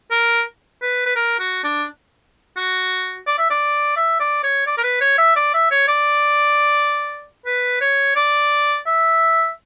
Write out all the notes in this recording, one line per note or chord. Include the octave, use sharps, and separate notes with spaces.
A#4
B4
B4
A#4
F#4
D4
F#4
D5
E5
D5
E5
D5
C#5
D5
A#4
B4
C#5
E5
D5
E5
C#5
D5
B4
C#5
D5
E5